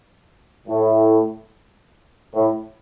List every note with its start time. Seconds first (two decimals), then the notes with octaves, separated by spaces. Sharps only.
0.68 A2
2.34 A2